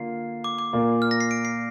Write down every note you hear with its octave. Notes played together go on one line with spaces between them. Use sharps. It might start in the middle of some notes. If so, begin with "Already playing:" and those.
Already playing: D3 A#3 F4 C7
D6
D6
A#2 A#3 F4 A#4 D5
F6
A#6
C7
D7
C7